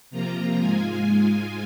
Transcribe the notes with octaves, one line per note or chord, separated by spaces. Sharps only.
C3 F3 A#3 F4 A#5
G#2 G#3 F4 G#5